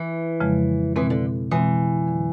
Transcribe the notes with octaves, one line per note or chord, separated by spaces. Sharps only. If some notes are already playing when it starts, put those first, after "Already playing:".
Already playing: E3
F2 C#3 F3 G#3
B2 E3 G#3 C4
D3
B2 E3 G#3 C4
F2 D3 F#3